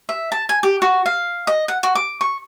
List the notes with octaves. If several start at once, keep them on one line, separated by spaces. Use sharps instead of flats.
E5
A5
G#5
G4
F#4
F5
D#5
F#5
F#4
D6
C#6